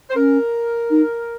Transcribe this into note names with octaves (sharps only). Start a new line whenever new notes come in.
C5
C#4 A#4
D#4